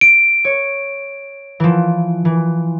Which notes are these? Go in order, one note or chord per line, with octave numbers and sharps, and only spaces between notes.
D7
C#5
E3 F3
E3